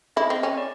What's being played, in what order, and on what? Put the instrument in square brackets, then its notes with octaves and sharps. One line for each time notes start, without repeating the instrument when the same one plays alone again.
[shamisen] E4 [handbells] D#5
[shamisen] C4
C#4
[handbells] D5